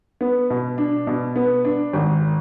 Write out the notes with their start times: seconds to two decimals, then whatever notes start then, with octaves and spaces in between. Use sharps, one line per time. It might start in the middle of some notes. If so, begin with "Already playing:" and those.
0.21 B3
0.50 B2
0.78 D4
1.07 B2
1.36 B3
1.65 D4
1.93 G#1